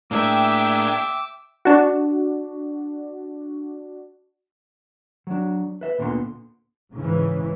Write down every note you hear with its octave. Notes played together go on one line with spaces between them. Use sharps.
A2 A#3 D4 G#4 E5 G5 D6 E6
D4 F#4
F#3 D4
B4 E5
D2 A#2 D3 B3 C6
G#2 C#3 E3